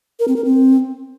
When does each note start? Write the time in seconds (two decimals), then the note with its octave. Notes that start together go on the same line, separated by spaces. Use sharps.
0.20 A#4
0.28 C4
0.36 A#4
0.45 C4